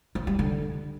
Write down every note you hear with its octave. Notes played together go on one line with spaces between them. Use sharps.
F3
G3
D3